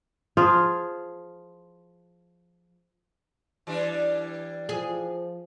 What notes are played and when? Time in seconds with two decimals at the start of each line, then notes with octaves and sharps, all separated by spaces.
0.37 F3 F4 G#4
3.67 E3 G3 D4
4.69 F3 G#4